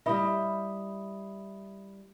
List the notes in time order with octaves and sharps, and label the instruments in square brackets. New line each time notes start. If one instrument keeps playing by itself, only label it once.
[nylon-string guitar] G3 E4 D#5 [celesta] E5 B5 D#6